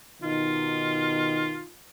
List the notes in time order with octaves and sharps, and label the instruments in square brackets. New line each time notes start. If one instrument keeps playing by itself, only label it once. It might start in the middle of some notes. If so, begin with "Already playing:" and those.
[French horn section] B2 D#3 D#4 [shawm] F4